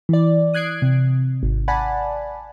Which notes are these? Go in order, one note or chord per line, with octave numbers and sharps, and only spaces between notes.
E3 D5
D#6 F#6 G#6 C7 D7
C3
G#1
D5 F#5 G#5 A5 B5